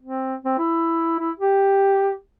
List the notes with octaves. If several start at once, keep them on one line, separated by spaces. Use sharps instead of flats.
C4
C4
E4
E4
G4